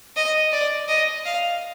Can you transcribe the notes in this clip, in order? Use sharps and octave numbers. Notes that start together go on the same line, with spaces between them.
D#5
D5
D#5
F5